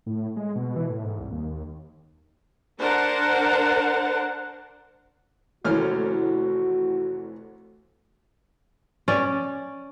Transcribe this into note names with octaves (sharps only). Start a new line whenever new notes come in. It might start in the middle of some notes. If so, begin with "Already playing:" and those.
A2
G#3
B2
E3
A2
G#2
C2
D#2
D4 A#4 C5 F#5 A5
F1 D#2 E3 C#4 F#4 F6
C#4 D5